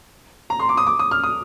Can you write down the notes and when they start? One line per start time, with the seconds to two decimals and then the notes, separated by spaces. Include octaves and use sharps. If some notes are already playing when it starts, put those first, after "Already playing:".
0.50 A#5
0.60 C6
0.69 D6
0.77 D#6
0.87 D6
0.99 D#6
1.11 F6
1.23 D#6